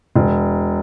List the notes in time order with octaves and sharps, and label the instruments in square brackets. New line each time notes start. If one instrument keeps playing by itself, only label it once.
[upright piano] E1